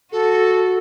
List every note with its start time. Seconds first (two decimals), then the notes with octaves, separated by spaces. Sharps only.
0.12 F#4 A4